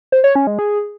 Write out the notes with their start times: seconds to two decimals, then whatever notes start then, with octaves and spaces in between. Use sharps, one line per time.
0.12 C5
0.24 C#5
0.35 C#4
0.47 G#3
0.59 G#4